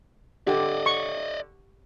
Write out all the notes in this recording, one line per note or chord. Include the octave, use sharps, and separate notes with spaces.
D3 G4 D5 D#5
C#6